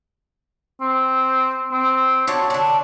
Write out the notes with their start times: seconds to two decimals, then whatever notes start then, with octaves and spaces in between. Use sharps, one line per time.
0.81 C4
1.72 C4
2.27 D4 F#4 C#5 F#5
2.50 D3 D4